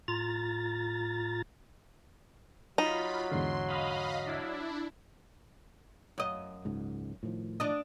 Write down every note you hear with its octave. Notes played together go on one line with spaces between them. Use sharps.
A2 F4 A#5 A6
F#3 D#4 F4 B5
E2 G#2 D3 C6
D#5 F5 B5
D4 E4
F#2 D#5
C#2 G#2
A2 D#3 F3
D4 D#5